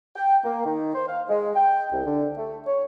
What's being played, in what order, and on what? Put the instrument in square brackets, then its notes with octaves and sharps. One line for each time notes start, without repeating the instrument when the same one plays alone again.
[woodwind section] G5
A#3
D#3
C5
F5
G#3
G5
C2
D3
A3
C#5